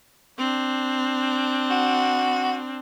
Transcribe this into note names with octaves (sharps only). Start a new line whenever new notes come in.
C4 D4
F#4